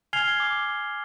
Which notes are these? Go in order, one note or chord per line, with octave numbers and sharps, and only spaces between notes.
G#5 F6 G#6 C7 F7 G7
D6